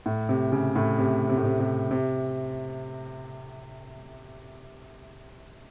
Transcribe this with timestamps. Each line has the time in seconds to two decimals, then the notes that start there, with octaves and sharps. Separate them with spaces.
0.06 A2
0.29 C3
0.52 C#3
0.75 A2
0.98 C3
1.29 C3
1.37 A2
1.45 C3
1.60 C3
1.91 C3